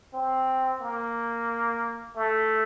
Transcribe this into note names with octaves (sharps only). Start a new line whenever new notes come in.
C4
A#3
A3